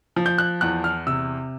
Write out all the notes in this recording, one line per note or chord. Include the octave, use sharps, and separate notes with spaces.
F3
G6
F#6
E2 F#6
F6
C3 E6